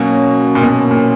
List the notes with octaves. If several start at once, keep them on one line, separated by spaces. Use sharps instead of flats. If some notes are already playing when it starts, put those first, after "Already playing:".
Already playing: B2 F#3 A#3 C#4 F#4
A#2
B2
A#2